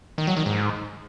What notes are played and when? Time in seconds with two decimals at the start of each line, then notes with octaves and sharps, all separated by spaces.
0.18 D#3
0.27 F#3
0.37 D#3
0.46 G#2